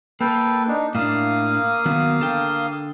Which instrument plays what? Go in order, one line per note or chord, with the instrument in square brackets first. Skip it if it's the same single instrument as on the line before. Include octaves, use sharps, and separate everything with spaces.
[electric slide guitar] A#3 [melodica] A4 B4 G5
[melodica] D4 D#4
[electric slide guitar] A2 D4 [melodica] A#3 F5 D#6
[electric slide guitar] D#3 F#3 B3
D3 A4 G5